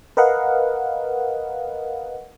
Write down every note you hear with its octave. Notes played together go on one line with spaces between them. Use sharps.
A#4 B4 D#5 F5 F#5